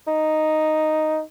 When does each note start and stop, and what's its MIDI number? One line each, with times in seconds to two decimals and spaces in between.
0.08 1.21 63